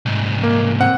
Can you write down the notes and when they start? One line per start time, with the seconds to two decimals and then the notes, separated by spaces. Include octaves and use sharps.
0.06 C2 G#2
0.43 A#3
0.80 C4 F#5